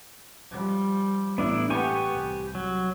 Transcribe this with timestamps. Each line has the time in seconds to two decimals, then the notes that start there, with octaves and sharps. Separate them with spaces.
0.51 F3 G3
1.38 A1 B3 D4 E4
1.70 B3 G4 G#5 C#6
2.12 C2
2.55 F#3